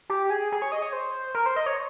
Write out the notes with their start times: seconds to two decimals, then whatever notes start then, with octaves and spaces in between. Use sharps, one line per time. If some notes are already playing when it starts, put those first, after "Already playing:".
0.10 G4
0.30 G#4
0.52 G#4
0.62 C#5
0.72 D#5
0.82 C#5
0.93 C5
1.34 A#4
1.46 C5
1.56 D#5
1.66 C#5